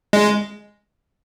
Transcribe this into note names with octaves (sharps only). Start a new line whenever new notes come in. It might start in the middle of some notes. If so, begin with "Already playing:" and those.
G#3